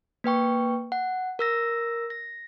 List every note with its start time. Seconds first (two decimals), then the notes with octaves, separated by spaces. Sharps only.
0.24 A#3 B4 G5 C#6
0.92 F#5
1.39 A#4 E6 A#6
2.10 A#6